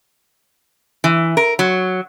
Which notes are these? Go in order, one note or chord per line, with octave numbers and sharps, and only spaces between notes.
E3
A#4
F#3